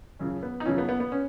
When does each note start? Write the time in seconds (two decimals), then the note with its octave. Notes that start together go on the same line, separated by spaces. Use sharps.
0.19 F#2 C#3 F3 C#4
0.43 B3
0.60 D#4
0.65 F#2 C#3 F3 C#4
0.78 B3
0.89 B3
1.00 B3
1.12 C#4